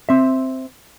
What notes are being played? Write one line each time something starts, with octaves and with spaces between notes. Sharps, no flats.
C4 E5